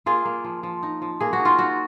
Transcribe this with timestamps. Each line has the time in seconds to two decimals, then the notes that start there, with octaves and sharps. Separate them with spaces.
0.06 A#3 F4 G#4
0.25 A#3
0.44 F3
0.63 F3
0.83 D#4
1.02 F3
1.20 A#3 G#4
1.33 F#4
1.40 D#4
1.45 F4
1.58 D#4 F#4